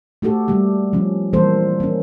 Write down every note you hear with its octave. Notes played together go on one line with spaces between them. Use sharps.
A3 F#4 G4 A4
G3 A#3 G4
F3 G3 C#4
E3 G3 A#3 C4 A4 C5
A#3 C#4